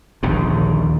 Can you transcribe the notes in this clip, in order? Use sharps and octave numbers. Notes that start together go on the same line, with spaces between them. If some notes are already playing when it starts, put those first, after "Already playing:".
A#1 D#2 D3 D#3